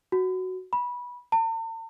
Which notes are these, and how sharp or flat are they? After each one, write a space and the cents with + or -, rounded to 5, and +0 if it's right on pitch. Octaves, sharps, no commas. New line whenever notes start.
F#4 +5
B5 -20
A5 +45